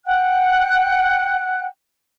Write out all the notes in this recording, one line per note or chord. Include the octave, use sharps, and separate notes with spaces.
F#5 G5 F#6